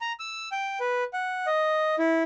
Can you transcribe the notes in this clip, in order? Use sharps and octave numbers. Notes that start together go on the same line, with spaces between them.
A#5
E6
G5
B4
F#5
D#5
E4